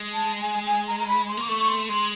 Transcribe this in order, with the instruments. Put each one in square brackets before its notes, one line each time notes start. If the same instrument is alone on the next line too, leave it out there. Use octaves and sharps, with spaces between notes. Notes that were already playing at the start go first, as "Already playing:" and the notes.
Already playing: [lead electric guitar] G#3
[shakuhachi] A5
G#5
G#5
A#5
A#5
B5
C6
[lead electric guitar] A#3 [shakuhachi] D6
[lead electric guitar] A3 [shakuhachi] C#6
[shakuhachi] C#6
C6
[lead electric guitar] G#3 [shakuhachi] C6